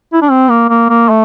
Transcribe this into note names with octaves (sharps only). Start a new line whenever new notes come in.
E4
D4
C4
A#3
A#3
A#3
A3